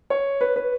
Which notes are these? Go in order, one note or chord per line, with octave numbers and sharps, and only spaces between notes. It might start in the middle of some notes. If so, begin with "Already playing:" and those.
C#5
B4
B4